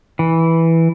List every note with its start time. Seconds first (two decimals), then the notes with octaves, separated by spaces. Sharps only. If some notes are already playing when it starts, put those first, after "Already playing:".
0.19 E3